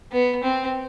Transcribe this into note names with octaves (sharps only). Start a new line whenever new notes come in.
B3
C4